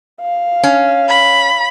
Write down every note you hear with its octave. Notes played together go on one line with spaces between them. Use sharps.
F5
C#4
B5